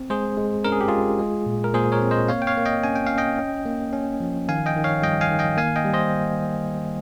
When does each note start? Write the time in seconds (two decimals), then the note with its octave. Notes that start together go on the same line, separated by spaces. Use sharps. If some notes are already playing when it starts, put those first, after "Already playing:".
Already playing: C4
0.10 G#3 G#4 C5
0.38 G#3
0.64 C#4 A#4
0.72 G#4
0.81 G4
0.88 G#3 F4 G#4
1.19 G#3
1.46 A#2
1.64 A#4
1.74 A#2 G#4 C5
1.92 A#4 C#5
2.02 C4
2.11 C5 D#5
2.28 A#3 C#5 F5
2.42 G5
2.47 C#5 F5
2.57 A#3
2.65 D#5 G5
2.84 C#4 G#5
2.96 G5
3.07 C#4 F5
3.18 D#5 G5
3.39 C#4
3.66 A#3
3.93 C#4
4.20 F3
4.49 D#3 F5 G#5
4.66 D#5 G5
4.76 D#3
4.84 C#5 F5
5.02 G3 D#5 G5
5.21 F5 G#5
5.31 D#3
5.39 D#5 G5
5.57 A#3 F5 G#5
5.76 D#5 G5
5.85 G3
5.94 C5 D#5